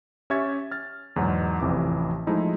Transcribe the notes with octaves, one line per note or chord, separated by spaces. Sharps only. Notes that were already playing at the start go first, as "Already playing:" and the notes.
C#4 G4 E5 C#6 G#6 A6
F6 A6
E2 G#2 B2 F#3 D#4
A1 F2 C3 E3 D6
F3 G#3 A3 D#4 E4 D#5